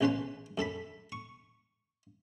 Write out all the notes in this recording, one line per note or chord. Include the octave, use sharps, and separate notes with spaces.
A1 C#3 C#4 B4 C5 A5
F#2 A4 A5 B5
C#6